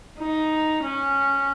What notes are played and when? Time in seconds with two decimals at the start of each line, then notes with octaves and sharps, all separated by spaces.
0.19 D#4
0.84 C#4